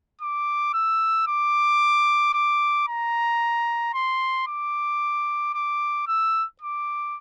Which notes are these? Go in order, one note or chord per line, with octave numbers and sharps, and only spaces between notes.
D6
E6
D6
D6
A#5
C6
D6
D6
E6
D6